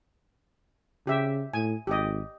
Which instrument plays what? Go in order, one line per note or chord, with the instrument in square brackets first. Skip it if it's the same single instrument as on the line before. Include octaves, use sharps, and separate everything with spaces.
[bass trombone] C#3 [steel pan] G4 E5
[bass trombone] A2 [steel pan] G#5
[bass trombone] G#1 [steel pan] G4 D#5